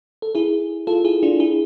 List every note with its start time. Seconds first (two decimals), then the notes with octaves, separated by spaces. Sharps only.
0.22 A4
0.35 E4 G#4
0.87 F4 A4
1.04 E4 G#4
1.23 D4 F4
1.40 E4 G#4